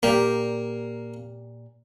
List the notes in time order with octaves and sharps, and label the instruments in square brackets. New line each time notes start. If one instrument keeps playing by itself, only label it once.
[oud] A#2 G4 D5 [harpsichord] A#3